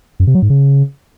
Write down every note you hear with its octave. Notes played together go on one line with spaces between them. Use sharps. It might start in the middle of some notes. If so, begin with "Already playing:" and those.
F#2
C3
F#3
G#2
C#3